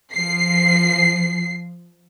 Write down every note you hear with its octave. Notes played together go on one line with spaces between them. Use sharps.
F3 C7